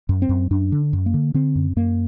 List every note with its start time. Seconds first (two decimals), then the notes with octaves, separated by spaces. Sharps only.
0.09 F#2
0.22 C4
0.29 F#2
0.51 F#2 D4
0.72 D3
0.93 F#2
1.06 A#3
1.14 D3
1.34 D3 C4
1.56 F#2
1.76 F#2 A#3